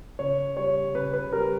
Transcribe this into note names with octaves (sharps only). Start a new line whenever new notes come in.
C#3 C#5
G3 C#5
C#3 B4
B4
G3 A#4